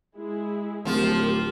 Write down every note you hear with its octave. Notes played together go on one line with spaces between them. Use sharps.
G#3 E4 G#4
D1 F3 F4 G4 A#4